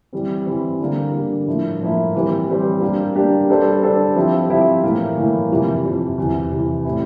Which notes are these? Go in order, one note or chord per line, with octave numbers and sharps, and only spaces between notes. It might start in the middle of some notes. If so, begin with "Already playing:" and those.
E3 G3 C4
E3 G3 C4
D3 G3 A#3
D3 G3 A#3
A2 F3 A#3 E4
A2 F3 A#3 E4
E3 G3 C4 G4 C5
E3 G3 C4 G4 C5
G3 A#3 D4 G4
G3 A#3 D4 G4
G3 D4 A4 C5
G3 D4 A4 C5
F3 C4 E4 G4
F3 C4 E4 G4
A2 E3 A#3
A2 E3 A#3
F2 C3 E3
F2 C3 E3
E2 C3 E3
E2 C3 E3
A2 G3 C4 E4